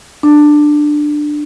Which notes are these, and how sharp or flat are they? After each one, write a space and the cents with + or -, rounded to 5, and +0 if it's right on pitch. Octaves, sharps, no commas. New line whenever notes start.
D4 +15